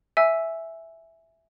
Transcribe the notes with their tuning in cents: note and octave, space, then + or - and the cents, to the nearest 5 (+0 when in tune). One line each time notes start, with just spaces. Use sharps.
E5 +0 G#5 +0 E6 +0